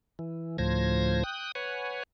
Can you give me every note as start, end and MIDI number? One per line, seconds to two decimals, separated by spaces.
0.19 0.57 52
0.58 1.24 38
0.58 1.24 45
0.58 1.24 53
0.58 1.24 72
0.58 1.24 92
0.58 1.24 94
1.24 1.52 79
1.24 1.52 87
1.24 1.52 90
1.55 2.03 71
1.55 2.03 73
1.55 2.03 78
1.55 2.03 80